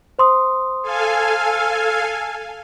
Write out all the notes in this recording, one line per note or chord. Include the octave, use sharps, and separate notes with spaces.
C5 C6 D#6
A4 F5 G#5